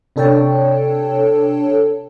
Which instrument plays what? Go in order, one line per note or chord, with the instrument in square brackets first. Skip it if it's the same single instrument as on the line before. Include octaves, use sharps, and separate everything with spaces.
[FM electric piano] C3 D4 A4 C#5 G5 A5